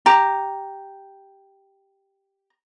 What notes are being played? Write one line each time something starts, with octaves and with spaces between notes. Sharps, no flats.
G4 A#5